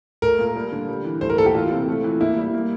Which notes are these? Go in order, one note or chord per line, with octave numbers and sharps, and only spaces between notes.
A3 A#4
A#2
G3
D3
G3
E3
A3 C5
A#4
A#2 A4
G4
E3 F4
C3
A3
E3
A#3 E4
G3
A#3